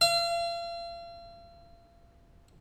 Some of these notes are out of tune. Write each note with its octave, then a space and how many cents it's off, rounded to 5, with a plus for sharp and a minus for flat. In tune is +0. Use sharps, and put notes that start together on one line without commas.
F5 -40